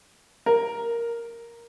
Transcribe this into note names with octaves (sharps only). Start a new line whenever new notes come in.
A#4